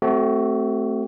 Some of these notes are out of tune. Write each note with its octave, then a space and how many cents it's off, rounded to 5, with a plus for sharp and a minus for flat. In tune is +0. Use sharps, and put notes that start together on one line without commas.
A3 +0 C4 +0 F#4 +35